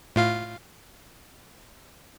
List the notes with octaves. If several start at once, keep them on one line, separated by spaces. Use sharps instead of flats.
A2 F4 F5